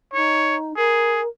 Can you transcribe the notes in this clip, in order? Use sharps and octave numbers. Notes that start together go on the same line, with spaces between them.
D#4 C#5
G#4 A#4